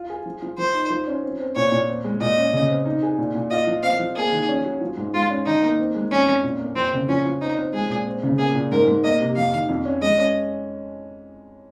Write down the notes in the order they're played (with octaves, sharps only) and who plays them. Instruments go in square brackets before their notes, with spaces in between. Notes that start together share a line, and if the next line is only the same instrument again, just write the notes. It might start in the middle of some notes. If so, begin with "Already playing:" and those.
Already playing: [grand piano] F4
G#4
F3
F3
[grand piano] F3 [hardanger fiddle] C5
[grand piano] D#4
F3
C#4
C4
C4
[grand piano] A#2 [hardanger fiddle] C#5
[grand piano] A#2
C4
G#3
[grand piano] A#2 [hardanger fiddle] D#5
[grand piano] C#4
C#3
C4
D#4
G#4
A#2
A#2
[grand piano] F4 [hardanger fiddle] D#5
[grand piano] F3
[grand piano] C4 [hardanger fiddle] F5
[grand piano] F3
[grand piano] A#3 [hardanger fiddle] G#4
[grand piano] D#3
C#4
F#3
F3
G#2
[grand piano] G#3 [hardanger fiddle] F4
[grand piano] C#4
[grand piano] D#3 [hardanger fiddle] D#4
[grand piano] A#3
C4
G#3
[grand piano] F2 [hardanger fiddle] C#4
[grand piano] F2
A#2
A#3
[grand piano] F2 [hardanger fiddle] C4
[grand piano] C#3
[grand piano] F3 [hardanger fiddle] C#4
[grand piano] F3
[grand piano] C4 [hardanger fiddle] D#4
[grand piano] C4
[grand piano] G#3 [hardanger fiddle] G#4
[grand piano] A#2
C4
C#3
[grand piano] A#3 [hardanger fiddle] G#4
[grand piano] A#2
[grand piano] G#2 [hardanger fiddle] A#4
[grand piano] G#2
[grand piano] A#3 [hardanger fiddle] D#5
[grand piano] C3
[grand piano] F2 [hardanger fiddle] F5
[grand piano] D#3
F2
C#4
[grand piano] G#3 [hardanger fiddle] D#5
[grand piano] C#4